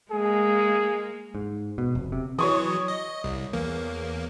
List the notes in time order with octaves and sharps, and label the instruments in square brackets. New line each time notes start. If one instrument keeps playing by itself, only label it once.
[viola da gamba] G#3 A#3 [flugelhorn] G#4
[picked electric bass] G#2
B2
F1
C3
[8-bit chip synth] E3 F#3 [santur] C#5 C#6 D#6
[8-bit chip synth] D#5
C2
E2 A#3